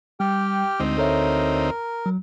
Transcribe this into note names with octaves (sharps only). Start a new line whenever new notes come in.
G3 G4 G5 F6
D2 G#3 C4 D#4 C5
A4 A#4 C#5 E5
F#3